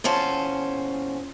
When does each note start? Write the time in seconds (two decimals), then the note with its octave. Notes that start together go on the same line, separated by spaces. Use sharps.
0.04 E2 A#2 C#4 C5 A5